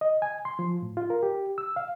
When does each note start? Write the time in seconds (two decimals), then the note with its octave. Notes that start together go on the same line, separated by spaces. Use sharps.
0.01 D#5
0.22 G#5
0.45 C6
0.59 F3
0.82 A2
0.97 F4
1.10 A#4
1.23 G4
1.58 E6
1.76 F5